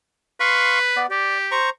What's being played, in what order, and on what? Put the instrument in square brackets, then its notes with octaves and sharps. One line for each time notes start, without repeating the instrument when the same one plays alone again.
[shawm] B4 [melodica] F5 C6 C#6
[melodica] B3 D5
[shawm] G4 [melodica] D5
[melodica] C5 A#5 C#6